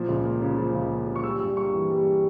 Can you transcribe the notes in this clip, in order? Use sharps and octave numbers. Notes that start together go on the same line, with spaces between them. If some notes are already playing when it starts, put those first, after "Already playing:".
Already playing: A#2 F3
C#2
A#3
C#3
F3
C#2
A#3
C#3
C#6
G3 E6
G2
A#3 C#6
E3
G3